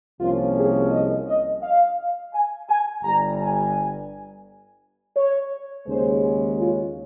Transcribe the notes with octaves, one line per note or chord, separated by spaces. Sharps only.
C2 C3 F3 A#3 C#4 F4
G#4
D#5
D#5
F5
G#5
G#5
G1 G2 G3 A#5
G#5
C#5
D#2 C#3 G#3 C#4 C5
F4